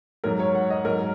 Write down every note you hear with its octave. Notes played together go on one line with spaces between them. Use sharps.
G#2 F#3 A#4
C#5
F#5
D#5
G#2 F#3 A#4